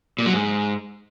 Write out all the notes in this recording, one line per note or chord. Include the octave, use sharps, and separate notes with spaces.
A#2
F#3
G#2